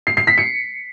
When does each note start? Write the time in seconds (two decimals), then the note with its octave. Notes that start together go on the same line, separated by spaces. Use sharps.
0.07 C7
0.17 C7
0.27 B6
0.38 C#7